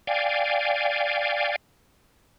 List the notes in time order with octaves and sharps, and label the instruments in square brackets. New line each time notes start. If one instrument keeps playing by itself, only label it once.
[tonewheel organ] D5 F5 G5 G#5